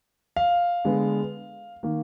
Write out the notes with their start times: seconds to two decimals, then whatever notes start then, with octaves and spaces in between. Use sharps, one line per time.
0.36 F5
0.85 D3 G#3 B3
1.83 D#3 A#3